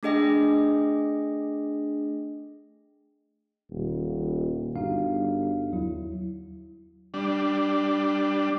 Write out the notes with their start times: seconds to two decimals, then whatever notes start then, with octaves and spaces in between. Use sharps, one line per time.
0.03 A3 D4 G#4 D#5 G5 A#6
3.71 D#1
4.76 G1 D#4 F#4 F5
5.72 D#2 F#3 E4
7.14 G3 D4